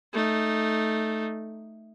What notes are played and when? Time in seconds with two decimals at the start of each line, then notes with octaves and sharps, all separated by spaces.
0.13 A3 D#4